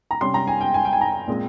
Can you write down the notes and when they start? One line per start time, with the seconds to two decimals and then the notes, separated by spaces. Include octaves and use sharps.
0.11 A#5
0.21 C3 G3 C#4 C6
0.34 A#5
0.47 G#5
0.61 G5
0.74 G#5
0.85 G5
0.93 G#5
1.01 A#5
1.28 A#2 G#3 C4